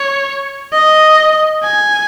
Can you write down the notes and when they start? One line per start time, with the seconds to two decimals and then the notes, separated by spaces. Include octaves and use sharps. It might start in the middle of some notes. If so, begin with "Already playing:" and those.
Already playing: C#5
0.73 D#5
1.64 G#5